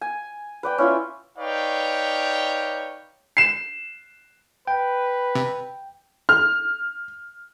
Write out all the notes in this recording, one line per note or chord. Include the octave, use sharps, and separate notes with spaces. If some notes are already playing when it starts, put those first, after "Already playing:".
G#5
B4 D5 G5
C#4 E4 F4
D#4 B4 C#5 D5 F5 G5
C7 E7
B4 G5
C3
F6